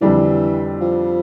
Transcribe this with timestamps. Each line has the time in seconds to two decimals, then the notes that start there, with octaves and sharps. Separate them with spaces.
0.01 F2 D3 E3 G3 D4
0.81 F3